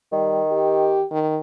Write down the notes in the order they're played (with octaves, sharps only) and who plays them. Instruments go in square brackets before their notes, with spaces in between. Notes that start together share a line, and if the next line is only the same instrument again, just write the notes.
[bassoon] D#3 [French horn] G3
[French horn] G4
D#3